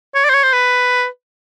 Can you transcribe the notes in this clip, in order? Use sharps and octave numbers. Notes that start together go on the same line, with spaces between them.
C#5
D5
C5
C#5
C5
B4